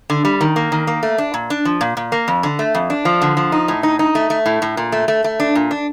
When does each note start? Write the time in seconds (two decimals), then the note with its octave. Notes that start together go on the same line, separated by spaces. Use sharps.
0.10 D3
0.25 G3
0.41 D#3
0.56 A#3
0.72 D#3
0.87 A#3
1.03 A3
1.18 D4
1.34 A#2
1.50 D4
1.65 F3
1.81 A#2
1.97 A#2
2.12 A#3
2.28 F2
2.43 D3
2.59 A3
2.75 F2
2.90 D4
3.05 F3
3.22 D3
3.37 F3
3.52 D#4
3.68 A2
3.83 D#4
3.99 D#4
4.15 A3
4.30 A3
4.46 A2
4.62 A2
4.77 A#2
4.92 A3
5.08 A3
5.24 A3
5.40 D4
5.55 A#2
5.71 D4